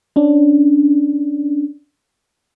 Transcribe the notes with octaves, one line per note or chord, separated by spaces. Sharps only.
C#4 D4